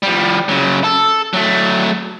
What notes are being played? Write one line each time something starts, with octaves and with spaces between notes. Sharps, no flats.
F3 G3
C#3 F#3
A4
F#3 A3